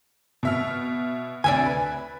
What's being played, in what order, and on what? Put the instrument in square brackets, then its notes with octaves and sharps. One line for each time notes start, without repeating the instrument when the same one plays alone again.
[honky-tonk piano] B2 E5 F6
[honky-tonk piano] D2 C3 [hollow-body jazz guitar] D5 E5 G#5
[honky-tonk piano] B4